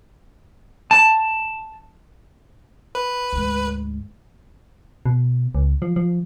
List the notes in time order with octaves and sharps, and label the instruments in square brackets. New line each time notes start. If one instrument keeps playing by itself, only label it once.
[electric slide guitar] A5
[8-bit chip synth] B4
[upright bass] D2 G#2
[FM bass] B2
C#2
F3
F3